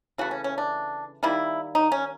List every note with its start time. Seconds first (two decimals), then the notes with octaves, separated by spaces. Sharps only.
0.18 C#3 E3 A3 F#4
0.31 C#4
0.44 C#4
0.58 D4
1.23 D#3 G3 A#3 E4
1.75 D#4
1.92 C#4